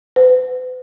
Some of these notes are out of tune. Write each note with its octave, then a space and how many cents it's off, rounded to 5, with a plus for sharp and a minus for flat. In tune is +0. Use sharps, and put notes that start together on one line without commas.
B4 +45